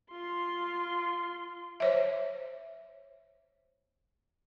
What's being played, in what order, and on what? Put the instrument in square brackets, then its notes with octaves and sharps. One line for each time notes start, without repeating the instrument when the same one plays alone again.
[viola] F4 C6
[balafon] C5 C#5 E5